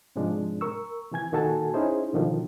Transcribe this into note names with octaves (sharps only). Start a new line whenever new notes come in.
G#2 C3 F3 G#3 D4
A#4 C#6 E6
C3 E3 G#5 G#6
A#2 D#3 F#4 A4 G#5 A5
C#4 D#4 E4 G#4 C5
B2 D3 D#3 F3 F#3